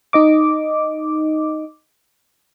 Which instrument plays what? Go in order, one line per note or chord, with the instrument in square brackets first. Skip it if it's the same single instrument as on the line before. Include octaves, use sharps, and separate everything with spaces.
[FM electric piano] D#4 D#5 D6